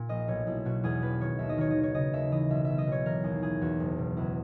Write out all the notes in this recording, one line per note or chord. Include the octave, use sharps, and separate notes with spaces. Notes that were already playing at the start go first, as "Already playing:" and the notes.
Already playing: A#2
A#1 D#5
B1 C#5
B1 E4
B2 F#4
E2 G#4
E1 B4
D#3 C#5
D#2 E5
D#5
D#3 C#5
D#5
D#3
C#5
C#3 D#5
D#2 E5
E3 D#5
B1 E5
B2 E5
D#5
B1 C#5
E3 A#4
D#2 G#4
E3 G#4
E2 F#4
F#1
B2
C#2 E4